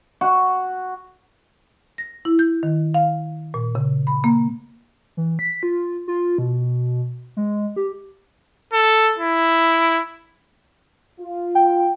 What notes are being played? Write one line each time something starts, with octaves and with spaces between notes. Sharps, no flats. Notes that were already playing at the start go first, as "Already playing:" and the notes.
F#4
A#6
E4
G6
D#3
F5
A#2
C#3
B5
A#3
E3
B6
F4
F4
B2
G#3
G4
A4
E4
F4
G5